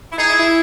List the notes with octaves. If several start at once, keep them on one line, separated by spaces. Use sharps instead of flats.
E4
D#4 G#4
E4
E4